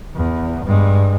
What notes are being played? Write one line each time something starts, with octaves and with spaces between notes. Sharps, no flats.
E2
G2 G#3